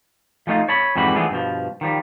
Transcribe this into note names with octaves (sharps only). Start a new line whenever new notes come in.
F3 G3 A3 D#4 F4
C#5 A5 B5
F2 G#2 E3 G3 F#4 B5
E3 F3 A3 B3 D4 G#4
G2 B2 F3
D#3 F3 G3